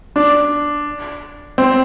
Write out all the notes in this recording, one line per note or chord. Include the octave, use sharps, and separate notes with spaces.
D4
C4